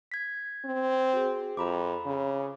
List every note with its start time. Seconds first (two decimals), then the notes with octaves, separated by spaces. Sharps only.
0.12 G#6 B6
0.65 C4
1.13 F#4 G#4
1.57 F2 A#5 B5 D6
2.06 C#3